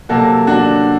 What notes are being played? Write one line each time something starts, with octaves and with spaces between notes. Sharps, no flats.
C3 F#3 A#3 F#4 A4
D4 F#4